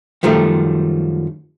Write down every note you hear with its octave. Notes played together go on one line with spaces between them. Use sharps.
F#2 D#3 F3 G3 A3